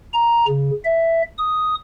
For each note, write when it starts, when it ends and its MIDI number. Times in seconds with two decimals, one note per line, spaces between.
0.13 0.46 82
0.48 0.70 49
0.85 1.22 76
1.38 1.75 87